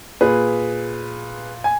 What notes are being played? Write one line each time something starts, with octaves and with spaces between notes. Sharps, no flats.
A#2 G#4 B4
G#5